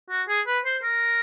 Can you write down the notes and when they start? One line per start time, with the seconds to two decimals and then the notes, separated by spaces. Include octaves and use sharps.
0.10 F#4
0.28 G#4
0.46 B4
0.65 C5
0.83 A#4